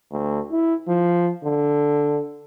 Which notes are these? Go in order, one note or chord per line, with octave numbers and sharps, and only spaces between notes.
D2
E4
F3
D3